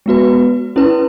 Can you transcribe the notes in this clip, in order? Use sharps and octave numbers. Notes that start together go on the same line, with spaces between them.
G#3 B3 F#4 B4
C#4 E4 B4